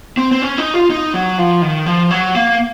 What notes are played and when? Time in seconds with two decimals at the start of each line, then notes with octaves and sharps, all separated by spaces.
0.17 C4
0.31 C4
0.42 C#4
0.58 D#4
0.74 F4
0.90 D#4
1.14 F#3
1.38 F3
1.62 D#3
1.86 F3
2.11 F#3
2.35 A#3